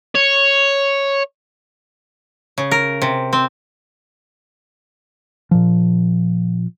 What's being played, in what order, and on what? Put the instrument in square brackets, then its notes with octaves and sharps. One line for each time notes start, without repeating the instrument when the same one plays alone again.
[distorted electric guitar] C#5
[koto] C#3
A#4
C3
C4
[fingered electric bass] A#2 F3